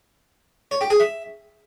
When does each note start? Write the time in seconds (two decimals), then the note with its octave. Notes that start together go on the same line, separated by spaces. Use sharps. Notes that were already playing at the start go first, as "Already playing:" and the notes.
0.71 C#5
0.81 G4
0.90 G#4
1.00 E5